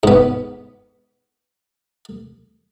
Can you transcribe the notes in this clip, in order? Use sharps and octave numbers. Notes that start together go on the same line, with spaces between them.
G#2 B3